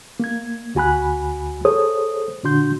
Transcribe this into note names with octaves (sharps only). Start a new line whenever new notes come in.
A#3 G#6
D2 F#4 G#5 B5 F#6
G#4 A4 C5 C#5 D#6
A#2 D3 D4 F#4 C6 G6